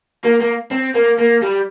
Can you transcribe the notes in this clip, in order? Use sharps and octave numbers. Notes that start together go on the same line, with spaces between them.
A#3
A#3
C4
A#3
A#3
G3